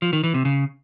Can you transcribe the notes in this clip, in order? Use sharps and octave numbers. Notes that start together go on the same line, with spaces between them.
F3
D#3
E3
C3
C#3